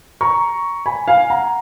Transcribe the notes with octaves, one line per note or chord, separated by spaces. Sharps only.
A#5 C#6
G#5 B5
F5 G#5
F#5 A#5